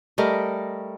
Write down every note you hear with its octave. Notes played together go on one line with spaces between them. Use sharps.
G3 A3 A#4 D#5